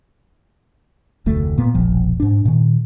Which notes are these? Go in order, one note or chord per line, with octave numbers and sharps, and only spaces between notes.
F1 D2 A3
A#2 B3
E1 A#1 F3
G#2 D4
A#2 D#3